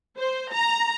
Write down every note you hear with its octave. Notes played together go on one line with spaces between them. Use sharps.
C5
A#5